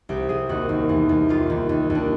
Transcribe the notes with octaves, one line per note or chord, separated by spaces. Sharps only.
C2 G4
C2 G#4
D#2 F#4
D#2
E2
E2
D#2 F4
D#2
D#2
D#2
D4